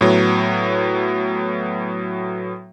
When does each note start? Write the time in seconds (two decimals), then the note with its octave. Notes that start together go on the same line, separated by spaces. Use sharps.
0.01 A2 F#3 B3